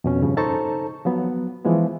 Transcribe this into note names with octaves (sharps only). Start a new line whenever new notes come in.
F2 B2 C#4
G2 C#3 F3
D#4 A4 C5 A5 A#5 C#6
F3 F#3 B3
E3 F3 G#3 B3